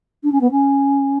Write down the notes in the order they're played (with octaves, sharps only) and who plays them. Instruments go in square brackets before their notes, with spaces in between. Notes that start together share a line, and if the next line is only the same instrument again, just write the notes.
[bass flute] D4
C#4
B3
C#4